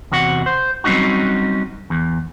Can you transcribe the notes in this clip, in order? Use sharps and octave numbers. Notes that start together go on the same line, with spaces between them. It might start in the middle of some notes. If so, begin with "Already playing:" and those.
E2 C3 F#4 F#5
C5
F#3 G3 C4 C#4 D#4 F#4
E2